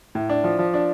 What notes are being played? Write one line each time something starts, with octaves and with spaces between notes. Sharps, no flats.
A2
D4
F3
F3
D4